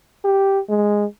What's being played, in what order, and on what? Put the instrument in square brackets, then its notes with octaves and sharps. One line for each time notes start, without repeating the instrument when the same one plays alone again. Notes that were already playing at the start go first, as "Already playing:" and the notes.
[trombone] G4
G#3